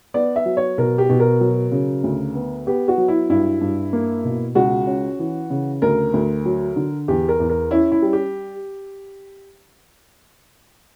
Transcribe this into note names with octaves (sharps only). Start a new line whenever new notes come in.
B3 D5
E5
F#3
C#5
B2 A#4
G4
B2
A#4
F#3
C#3
D2
B3
B3 G4
F#4
F#3
E4
G2 E4
G2
A#3
B2
C#2 F#4
C#4
E3
C#3
D2 A#4
D2
F#3
D3
E2 G4
A#4
E2
A#4
C#4 E4
E4
G3
G4